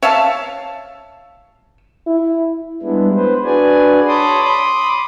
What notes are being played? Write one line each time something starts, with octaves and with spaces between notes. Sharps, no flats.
C#5 E5 F5 A5
E4
G3 G#3 B3 D4 E4
B4 C5
D4 F#4 G#4 B4 D5 G#5
C#5 A5 B5 C6 D6 D#6
B5 C6 D6 D#6